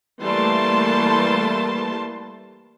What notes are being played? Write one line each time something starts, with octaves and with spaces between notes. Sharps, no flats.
E3 G3 A3 A#3 A5 C6